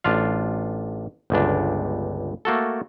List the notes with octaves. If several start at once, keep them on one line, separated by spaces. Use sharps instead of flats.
A1 D4 F4 F5
G1 C#2 D4
A3 A#3 F#4 A4